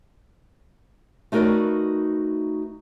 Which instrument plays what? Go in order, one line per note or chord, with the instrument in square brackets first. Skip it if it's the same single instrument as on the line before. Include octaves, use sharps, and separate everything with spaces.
[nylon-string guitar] A3 D#4 F#4 A#4 B4 D5